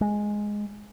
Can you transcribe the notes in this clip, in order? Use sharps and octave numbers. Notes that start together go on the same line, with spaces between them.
G#3